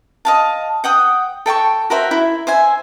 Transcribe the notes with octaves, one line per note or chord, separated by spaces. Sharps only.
D#5 F5 A5
F#5 G5 D#6
A4 G5 A5 C#6
F#4 A#4 C5 E5
E4
C5 E5 G#5